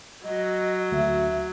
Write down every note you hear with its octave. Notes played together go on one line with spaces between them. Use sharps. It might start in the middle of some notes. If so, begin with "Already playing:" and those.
F#3 D#5
D2 E5